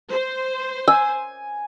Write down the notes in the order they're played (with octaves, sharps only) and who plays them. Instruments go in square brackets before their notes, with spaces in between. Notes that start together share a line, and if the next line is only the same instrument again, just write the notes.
[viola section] C5
[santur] G#5 [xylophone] E6